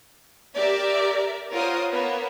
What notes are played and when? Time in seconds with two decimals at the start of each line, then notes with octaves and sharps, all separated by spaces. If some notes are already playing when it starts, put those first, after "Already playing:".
0.55 G4 A#4 D5 E5
1.54 F4 A#4 C5 C#5 F#5 D#6
1.91 A#3 B3 A#4 B4 C#5